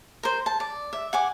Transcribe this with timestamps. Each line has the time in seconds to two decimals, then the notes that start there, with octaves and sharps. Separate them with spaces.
0.23 A#4 C5
0.46 A5
0.60 D5
0.93 E5
1.13 F#5 G#5 D6